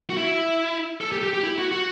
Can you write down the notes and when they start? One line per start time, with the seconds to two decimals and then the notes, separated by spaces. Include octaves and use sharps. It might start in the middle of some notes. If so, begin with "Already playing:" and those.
0.10 F#4
0.17 E4
1.01 A4
1.12 G4
1.18 A4
1.23 G4
1.34 G4
1.43 E4
1.58 F#4
1.71 F#4